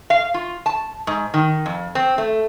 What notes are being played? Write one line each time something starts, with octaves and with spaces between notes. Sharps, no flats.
F5
F4
A5
G#2
D#3
F2
C4
A3